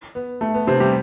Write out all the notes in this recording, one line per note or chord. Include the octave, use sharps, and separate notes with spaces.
B3
A3
B3
C3 C4
G3 G4